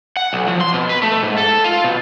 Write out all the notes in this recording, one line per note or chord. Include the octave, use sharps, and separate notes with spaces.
F#5
B1
F3
C6
B2
B4
A3
G#2
A4
F4
B2